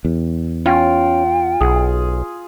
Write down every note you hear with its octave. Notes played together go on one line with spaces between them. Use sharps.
E2
C#4 F4 G5
B1 G#4